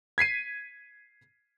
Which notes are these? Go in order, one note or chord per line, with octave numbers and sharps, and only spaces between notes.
G#6 B6 C7 D#7